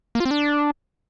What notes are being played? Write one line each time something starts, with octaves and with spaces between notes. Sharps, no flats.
A#3
F4
C4
D4